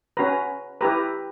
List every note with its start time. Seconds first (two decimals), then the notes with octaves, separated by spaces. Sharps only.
0.17 C#4 F#4 B4 A#5
0.81 E4 G4 B4 A#5